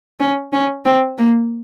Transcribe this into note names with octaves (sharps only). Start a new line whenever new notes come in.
C#4
C#4
C4
A#3